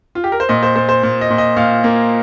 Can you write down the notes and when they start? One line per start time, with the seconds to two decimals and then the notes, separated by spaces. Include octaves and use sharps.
0.15 F4
0.24 G4
0.32 A#4
0.40 C5
0.49 A#2 D#5
0.63 C5
0.76 A#2 C5
0.89 C5
1.03 A#2
1.21 D#5
1.30 A#2
1.38 D#5
1.56 A#2 F5
1.84 A#3